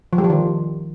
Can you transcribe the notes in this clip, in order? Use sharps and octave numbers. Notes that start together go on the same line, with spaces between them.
F3
G3
F3
D#3